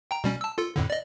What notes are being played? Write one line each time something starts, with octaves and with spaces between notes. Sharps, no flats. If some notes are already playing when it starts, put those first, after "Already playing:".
G5 A#5
B2 G3 C#4
A5 E6
F4 A4
F2 A2 D3
D5 D#5